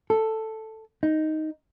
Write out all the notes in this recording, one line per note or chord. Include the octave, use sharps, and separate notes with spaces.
A4
D#4